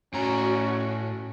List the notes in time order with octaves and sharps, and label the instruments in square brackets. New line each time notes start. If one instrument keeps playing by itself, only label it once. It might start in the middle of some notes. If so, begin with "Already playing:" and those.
[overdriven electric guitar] A2 A#5 [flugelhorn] C#4 [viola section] F#4